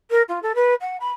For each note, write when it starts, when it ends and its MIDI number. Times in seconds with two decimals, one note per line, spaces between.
0.10 0.22 70
0.28 0.39 65
0.42 0.52 69
0.55 0.74 71
0.81 0.97 78
1.00 1.10 83